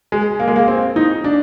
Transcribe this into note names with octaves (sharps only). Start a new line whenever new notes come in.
G#3
A#3
G#3
A#3
C4
D#4
D4